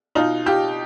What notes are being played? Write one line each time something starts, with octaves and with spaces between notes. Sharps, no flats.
B2 D#4 F4
F4 G4